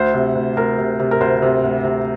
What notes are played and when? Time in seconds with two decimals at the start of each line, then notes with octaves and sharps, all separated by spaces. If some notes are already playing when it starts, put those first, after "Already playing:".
Already playing: D2 C5
0.14 C3
0.35 D2
0.57 D2 A#4
0.78 C3
1.00 C3
1.11 A#4
1.21 D2 C5
1.42 C3
1.64 D2
1.84 C3